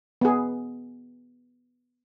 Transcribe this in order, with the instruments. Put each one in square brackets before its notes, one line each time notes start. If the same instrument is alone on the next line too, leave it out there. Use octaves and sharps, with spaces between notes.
[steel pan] B3 G#4